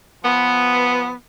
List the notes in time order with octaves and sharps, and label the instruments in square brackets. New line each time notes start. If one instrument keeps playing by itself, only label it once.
[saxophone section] F3 B3